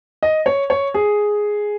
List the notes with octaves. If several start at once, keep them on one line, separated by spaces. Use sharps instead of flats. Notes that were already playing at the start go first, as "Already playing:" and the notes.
D#5
C#5
C#5
G#4